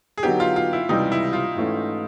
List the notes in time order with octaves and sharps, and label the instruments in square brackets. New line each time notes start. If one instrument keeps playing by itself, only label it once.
[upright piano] G#4
[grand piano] D3 F#3 B3 D#4 [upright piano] G4
[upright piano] F4
F4
E4
[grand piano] C#2 C3 E3 G3 [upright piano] D#4
[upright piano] E4
F4
[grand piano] G#2 E3 A3 C#4